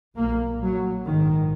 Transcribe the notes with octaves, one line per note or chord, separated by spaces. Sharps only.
B1 A#2 A#3
F#3
A#1 G#2 D#3